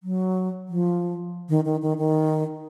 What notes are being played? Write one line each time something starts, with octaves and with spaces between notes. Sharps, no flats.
F#3
F3
D#3
D#3
D#3
D#3